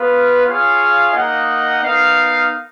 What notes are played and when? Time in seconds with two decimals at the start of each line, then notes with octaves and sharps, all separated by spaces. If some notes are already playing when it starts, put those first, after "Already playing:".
Already playing: B3 F4 B4 F5
0.46 F4 G#4 C#5 F5
1.13 A#3 D#4 A#4 D#5 F#5
1.80 B3 D#4 A#4 F5